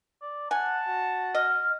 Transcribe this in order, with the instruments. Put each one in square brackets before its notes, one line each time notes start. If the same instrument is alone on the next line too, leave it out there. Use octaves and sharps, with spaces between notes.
[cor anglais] D5
[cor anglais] F#5 [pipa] G#5 [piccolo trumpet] A5
[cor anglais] F#4
[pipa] D#5 [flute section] F6